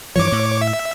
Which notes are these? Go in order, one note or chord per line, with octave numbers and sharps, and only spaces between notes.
G2 E3 F3 C#5 D6
A2
E5